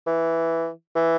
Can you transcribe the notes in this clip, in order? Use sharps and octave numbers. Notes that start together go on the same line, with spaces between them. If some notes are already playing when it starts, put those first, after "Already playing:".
E3
E3